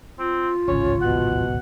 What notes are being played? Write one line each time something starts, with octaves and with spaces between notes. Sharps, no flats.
C4 F4
D1 G#1 C#2 C#4 C#5
B2 F#5